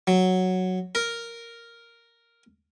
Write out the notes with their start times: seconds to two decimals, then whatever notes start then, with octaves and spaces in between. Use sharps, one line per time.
0.07 F#3
0.95 A#4